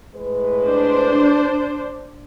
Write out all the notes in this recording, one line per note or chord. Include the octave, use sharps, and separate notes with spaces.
A2 G#3 B4
D4 C5